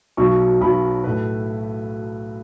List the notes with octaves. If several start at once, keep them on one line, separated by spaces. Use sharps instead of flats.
B1 B2 F#3 C#6
B1 B2 F#3 B5
A2 A3 B4